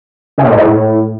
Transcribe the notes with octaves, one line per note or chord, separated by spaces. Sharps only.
C#3
A#2
G#2
A2